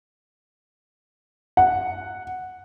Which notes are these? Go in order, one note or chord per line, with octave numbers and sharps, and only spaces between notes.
F#5